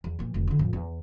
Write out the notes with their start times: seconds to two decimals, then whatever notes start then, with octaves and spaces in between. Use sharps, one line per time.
0.04 E2
0.19 A#2 F3
0.34 F1 D2
0.47 D3 E4
0.59 F2 A2
0.73 E2